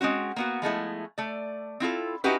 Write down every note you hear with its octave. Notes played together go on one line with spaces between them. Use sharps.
G#3 C4 C#4 F#4
A#3 B3 F#4
F3 G#3 A3 E4
A3 D5
C4 E4 F4 A4
C#4 D#4 E4 F#4 G4 B4